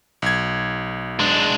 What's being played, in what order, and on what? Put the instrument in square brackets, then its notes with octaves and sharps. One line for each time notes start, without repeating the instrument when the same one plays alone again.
[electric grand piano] B1 G#6
[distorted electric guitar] G#3 D4